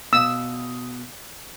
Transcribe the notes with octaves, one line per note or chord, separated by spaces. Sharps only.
B2 F5 D#6 E6